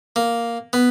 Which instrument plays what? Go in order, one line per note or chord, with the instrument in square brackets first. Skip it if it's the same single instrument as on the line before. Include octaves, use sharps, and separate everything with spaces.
[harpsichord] A#3
B3